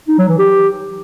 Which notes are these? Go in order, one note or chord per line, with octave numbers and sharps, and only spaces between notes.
D#4
F#3
E3
G4